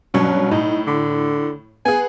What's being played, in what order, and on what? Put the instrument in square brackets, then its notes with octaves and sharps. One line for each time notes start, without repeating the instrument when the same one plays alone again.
[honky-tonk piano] G2 B2 F#3 [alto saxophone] C#4
[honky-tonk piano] A2 [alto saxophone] D#4
[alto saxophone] D3
[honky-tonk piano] B3 G#4 [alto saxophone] G#5